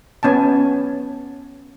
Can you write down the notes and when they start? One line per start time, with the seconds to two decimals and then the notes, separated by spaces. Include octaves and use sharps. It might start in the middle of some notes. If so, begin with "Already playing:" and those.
0.23 B3 C#4 G#5 A5